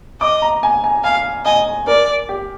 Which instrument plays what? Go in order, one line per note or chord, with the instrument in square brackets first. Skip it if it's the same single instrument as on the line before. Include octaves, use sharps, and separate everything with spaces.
[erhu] D#5 [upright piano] D6
[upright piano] A#5
G#5
G#5
[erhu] F5 [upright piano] G#5
[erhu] D#5 [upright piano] G#5
[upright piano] A#4 [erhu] D5
[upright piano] G4